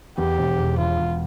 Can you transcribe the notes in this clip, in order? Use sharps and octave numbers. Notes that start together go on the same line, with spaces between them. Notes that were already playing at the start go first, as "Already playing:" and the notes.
E2 G4
E1
E1
E1 F4
E1